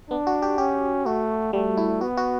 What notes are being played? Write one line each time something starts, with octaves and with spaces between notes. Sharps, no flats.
B3 D4
F#4
G4
C#4 G4
A3 F#4
G3 A3
E4
B3 F#4
F#4